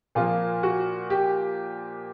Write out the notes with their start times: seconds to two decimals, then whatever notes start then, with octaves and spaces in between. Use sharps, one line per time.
0.15 A#2 F3 A#3 F4
0.63 F#4
1.10 G4